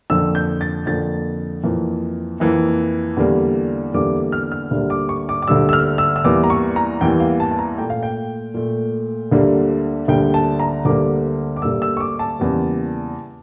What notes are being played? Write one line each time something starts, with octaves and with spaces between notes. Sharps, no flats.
F2 D3 F3 A#3 E6
G6
A6
F2 D3 F3 A#3 A6
F2 E3 A#3
F2 E3 A#3
E2 D3 G3 A#3
E2 D3 G3 A#3 D6
F6
F6
D2 D3 G3 A#3
D6
C#6
D6
D6
D2 D3 G3 A#3 E6
E6
F6
E6
E6
E2 E3 G3 A#3 D6
A#5
C#6
A#5
E2 E3 G3 A#3 G5
F5
A5
A5
A#5
A#2 A3 G5
F5
G5
A#2 A3
D2 D3 G3 A#3
D2 D3 G3 A#3 G5
A5
A#5
D2 D3 G3 A#3 D6
D6
D2 D3 G3 A#3 E6
E6
C#6
D6
A5
E2 C#3 G3 A#3